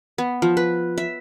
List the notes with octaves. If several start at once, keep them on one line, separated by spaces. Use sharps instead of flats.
B3
F3
B4
E5